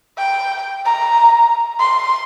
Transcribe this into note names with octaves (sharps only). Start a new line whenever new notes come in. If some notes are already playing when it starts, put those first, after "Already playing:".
G5
A#5
C6